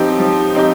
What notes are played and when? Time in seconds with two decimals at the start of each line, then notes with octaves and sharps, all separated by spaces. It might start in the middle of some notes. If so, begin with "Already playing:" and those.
Already playing: F3 C4 D#4 G4
0.19 F3
0.55 C4 D#4 G4